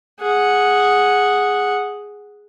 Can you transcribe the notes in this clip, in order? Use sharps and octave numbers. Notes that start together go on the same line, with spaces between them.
G#4 F#5